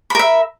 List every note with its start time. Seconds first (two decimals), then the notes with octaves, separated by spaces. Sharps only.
0.10 B5
0.15 A#4
0.19 E5